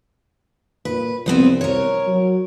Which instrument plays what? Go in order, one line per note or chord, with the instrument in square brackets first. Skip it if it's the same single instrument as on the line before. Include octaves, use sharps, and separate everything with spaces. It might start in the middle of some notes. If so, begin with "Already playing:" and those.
[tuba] A#2 [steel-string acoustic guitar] B4
[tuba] C2 [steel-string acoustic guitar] F3 B3 C4
[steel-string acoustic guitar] A#4 C#5
[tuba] F#3